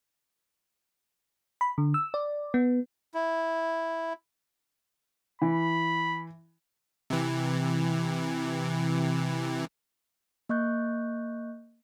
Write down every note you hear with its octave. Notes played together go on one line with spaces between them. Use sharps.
B5
D3
E6
D5
B3
E4
E3 B5
C3 E3
A#3 D#5 C#6 F#6 G6